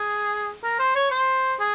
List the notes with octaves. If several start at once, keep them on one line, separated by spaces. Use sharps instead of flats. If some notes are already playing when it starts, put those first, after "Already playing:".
Already playing: G#4
A#4
C5
C#5
C5
G#4